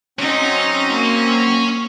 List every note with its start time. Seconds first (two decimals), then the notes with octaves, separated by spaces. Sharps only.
0.19 F#3 C4 C#4 D#4 C6
0.94 A#3